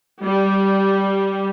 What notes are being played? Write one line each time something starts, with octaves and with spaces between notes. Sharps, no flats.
G3